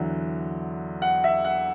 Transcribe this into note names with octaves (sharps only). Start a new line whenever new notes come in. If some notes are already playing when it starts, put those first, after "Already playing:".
Already playing: E2 D3 F#3
F#5
E5
F#5